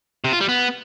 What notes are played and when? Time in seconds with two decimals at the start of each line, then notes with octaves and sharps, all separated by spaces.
0.24 C3
0.32 F4
0.41 G3
0.49 B3